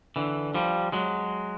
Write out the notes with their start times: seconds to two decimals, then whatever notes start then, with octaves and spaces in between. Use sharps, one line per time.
0.16 D3 E3
0.54 F3 G3
0.92 F#3 G#3